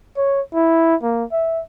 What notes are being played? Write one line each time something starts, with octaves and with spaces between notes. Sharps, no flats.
C#5
E4
A#3
E5